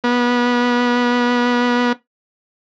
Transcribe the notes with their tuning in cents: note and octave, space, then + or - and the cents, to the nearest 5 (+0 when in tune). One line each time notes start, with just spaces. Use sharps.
B3 -25